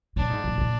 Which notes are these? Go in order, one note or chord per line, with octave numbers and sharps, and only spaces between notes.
A#2 D4
G#2
A#2
A#2